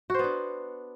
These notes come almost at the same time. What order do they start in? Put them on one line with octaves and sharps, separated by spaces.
F#4 C5 B3 D4